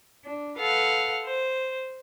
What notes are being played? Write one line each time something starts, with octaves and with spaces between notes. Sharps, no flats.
D4
A4 B4 F5 F#5
C5